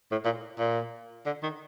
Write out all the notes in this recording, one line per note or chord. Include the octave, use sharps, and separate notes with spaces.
A2
A#2
A#2
D3
D#3